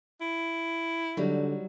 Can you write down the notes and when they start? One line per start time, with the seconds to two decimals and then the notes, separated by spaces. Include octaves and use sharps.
0.21 E4
1.17 D3 F#3 G3 D#4